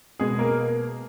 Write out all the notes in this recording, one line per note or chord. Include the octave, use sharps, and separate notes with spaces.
B2 G#3 G#4
A#3 A#4